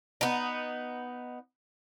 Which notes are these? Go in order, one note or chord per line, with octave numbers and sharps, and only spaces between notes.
B3 D#4